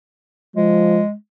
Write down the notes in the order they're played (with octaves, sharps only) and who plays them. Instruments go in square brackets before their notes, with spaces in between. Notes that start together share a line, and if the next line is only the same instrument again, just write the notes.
[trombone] F3 [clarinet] G#3